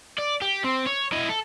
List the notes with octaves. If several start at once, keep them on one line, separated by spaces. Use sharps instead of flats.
D5
G4
C4
C#5
E4 D#5
A4